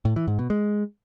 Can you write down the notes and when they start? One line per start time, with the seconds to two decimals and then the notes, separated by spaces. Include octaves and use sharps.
0.05 A2
0.16 E3
0.28 G#2
0.39 B2
0.50 G#3